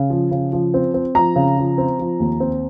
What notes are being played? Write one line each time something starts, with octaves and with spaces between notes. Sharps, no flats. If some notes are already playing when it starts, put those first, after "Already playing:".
Already playing: C#3
F3
C#3
F3
C4
C4
F3 A#5
C#3
F3
C4
F3
D#2
C4